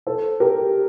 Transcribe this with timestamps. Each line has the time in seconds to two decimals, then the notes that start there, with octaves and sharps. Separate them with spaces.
0.07 A4 C5
0.40 G4 A#4